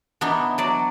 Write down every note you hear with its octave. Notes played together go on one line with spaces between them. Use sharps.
E3 B3 D4 D#4
F#3 D5